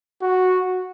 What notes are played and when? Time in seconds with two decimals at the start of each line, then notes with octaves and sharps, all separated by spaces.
0.22 F#4